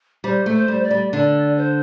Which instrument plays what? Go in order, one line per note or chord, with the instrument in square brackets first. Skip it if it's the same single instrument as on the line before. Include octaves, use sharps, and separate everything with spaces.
[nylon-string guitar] G3 [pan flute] C5
[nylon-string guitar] A3
[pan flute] C5
[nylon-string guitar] G3
[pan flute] D5
[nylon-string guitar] G3
[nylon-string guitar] D3 [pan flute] D5
[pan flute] C5